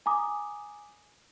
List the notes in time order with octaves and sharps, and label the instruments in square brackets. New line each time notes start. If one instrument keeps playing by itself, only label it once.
[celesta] G#5 A#5 D6 D#6